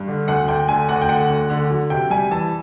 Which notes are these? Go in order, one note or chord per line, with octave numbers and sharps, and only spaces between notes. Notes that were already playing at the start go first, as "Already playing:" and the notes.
Already playing: G2
D3
D2 F#5
D2 G5
D3 G#5
D2 F#5
G5
D3 F#5
D2
D3
F#3
C3 G5
G3 G#5
E3 A5